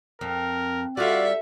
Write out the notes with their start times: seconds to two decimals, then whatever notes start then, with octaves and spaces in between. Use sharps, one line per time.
0.21 F2 A#4
0.97 G3 F4 F#4 A4 D5 E5 F5 E6